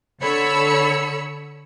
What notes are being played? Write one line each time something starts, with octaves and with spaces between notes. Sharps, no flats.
D3 A4 C#5 B5 E6 C#7